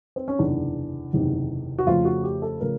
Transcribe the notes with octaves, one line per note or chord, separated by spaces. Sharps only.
C4
C#4
F#1 E2 C3 D#3 D4
F#1 E2 C3 D#3
F#4
F2 C#3 F3 A3 F4
F#4
G4
A4
C#3 F3 A3 A#4